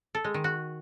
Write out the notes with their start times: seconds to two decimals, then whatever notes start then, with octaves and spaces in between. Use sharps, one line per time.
0.15 A4
0.24 G#3
0.34 D#3
0.44 F#4